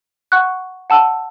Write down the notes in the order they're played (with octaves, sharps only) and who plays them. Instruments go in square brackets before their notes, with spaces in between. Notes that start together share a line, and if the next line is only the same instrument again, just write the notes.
[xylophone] F#5 C#6 F#6
F#5 A5 E6